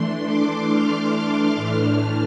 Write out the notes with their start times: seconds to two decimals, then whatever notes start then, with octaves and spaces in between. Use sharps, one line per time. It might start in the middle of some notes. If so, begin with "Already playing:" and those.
Already playing: E3 A3 D4 C6
0.25 D6
0.68 F6
1.56 A2 E3 A3 D4